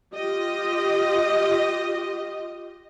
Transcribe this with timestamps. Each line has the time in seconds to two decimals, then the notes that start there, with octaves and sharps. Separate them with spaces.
0.14 F4 G4 D#5